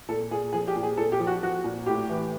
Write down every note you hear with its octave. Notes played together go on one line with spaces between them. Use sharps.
A#2 A4
A#2 G#4
F3 G#4
G4
A#2
G#4
A#2 A4
G4
F3
F#4
F3 F#4
A#2
A2 G4
E3